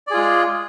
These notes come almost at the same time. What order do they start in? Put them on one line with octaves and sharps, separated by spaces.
D5 G#4 F4 G#3